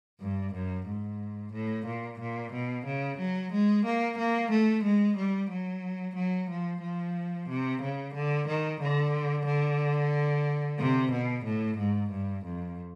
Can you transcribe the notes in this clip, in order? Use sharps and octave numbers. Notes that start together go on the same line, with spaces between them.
G2
F#2
G#2
A2
A#2
A#2
B2
C#3
F#3
G#3
A#3
A#3
A3
G#3
G3
F#3
F#3
F3
F3
C3
C#3
D3
D#3
D3
D3
C3
B2
A2
G#2
G2
F2